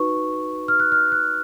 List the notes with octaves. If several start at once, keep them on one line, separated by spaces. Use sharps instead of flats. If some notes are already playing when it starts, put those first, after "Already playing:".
Already playing: D#4 F#4 B4 C#6
F6
F#6
F6
F#6